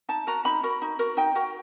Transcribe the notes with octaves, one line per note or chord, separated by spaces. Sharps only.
D#4 A5
F#4 A#4 A#5
D#4 B5
F#4 A#4
D#4
F#4 A#4
D#4 G5
F#4 A#4